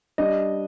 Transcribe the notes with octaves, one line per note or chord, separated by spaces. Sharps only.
G3 D4 D#5